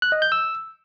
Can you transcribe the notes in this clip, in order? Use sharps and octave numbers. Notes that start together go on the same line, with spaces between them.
F#6
D#5
G6
E6